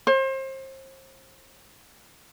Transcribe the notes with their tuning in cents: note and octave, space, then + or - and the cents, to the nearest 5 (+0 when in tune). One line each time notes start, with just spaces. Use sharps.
C5 +35